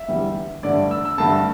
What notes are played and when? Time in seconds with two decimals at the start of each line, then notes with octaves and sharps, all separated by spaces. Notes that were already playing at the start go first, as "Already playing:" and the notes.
Already playing: E5
0.08 E2 D3 G3
0.63 G2 D3 A3 D5
0.91 E6
1.05 E6
1.18 G2 D3 A3 A5